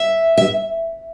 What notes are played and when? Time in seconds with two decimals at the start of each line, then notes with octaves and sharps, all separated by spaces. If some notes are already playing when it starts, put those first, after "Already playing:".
Already playing: E5
0.38 E5